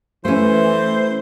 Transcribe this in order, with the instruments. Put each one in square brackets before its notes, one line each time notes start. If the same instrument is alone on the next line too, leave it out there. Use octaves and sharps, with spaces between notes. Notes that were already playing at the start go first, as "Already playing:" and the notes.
[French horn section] E3 [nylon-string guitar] A3 C#4 [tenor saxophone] C5